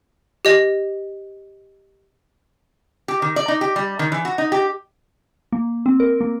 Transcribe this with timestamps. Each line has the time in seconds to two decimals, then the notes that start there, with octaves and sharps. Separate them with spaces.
0.45 G4 D#5
3.08 G4
3.22 D#3
3.36 D5
3.48 D#4
3.61 G4
3.76 G3
3.99 D#3
4.12 E3
4.25 F#4
4.38 D#4
4.52 G4
5.52 A#3
5.86 C4
6.00 A#4
6.21 A#3